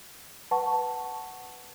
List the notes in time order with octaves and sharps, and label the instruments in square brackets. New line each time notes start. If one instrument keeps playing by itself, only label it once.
[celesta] B4 F#5 A5 C#6